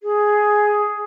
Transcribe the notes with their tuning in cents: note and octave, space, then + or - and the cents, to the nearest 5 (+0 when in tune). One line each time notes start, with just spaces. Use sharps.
G#4 +5